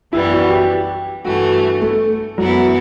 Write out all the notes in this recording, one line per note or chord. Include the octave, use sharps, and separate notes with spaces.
F#2 E3 G3 B3 E4
F#4
G4
G2 E3 A3 F#4
A3
F#2 E3 F#3 B3 E4